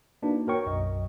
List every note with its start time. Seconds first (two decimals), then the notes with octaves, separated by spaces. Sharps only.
0.22 A#3 D4 D#4 F#4 B4
0.47 F#4 A#4 C#5 G5 C#6
0.65 B1 F#2 D#5